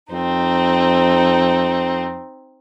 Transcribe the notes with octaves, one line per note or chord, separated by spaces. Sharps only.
F2 C4 D#4